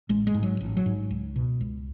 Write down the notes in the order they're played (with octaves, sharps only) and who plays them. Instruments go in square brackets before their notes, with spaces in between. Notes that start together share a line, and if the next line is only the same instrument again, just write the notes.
[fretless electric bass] A1 G#3
G#3
G#2
F#3
A1
F#3
G#2
C#2
B2
C#2